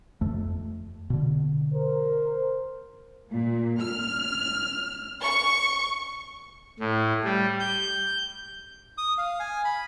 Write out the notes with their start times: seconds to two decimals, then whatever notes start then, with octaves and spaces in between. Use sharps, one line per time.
0.21 F2 A3
1.10 B2 D3
1.73 A#4 C5
3.30 A#2
3.81 F6
5.23 C#6
6.80 A2
7.24 G3
7.60 G6
8.98 D#6
9.18 F5
9.40 G#5
9.65 B5